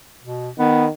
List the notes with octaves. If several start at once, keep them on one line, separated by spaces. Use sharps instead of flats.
B2
D#3 B3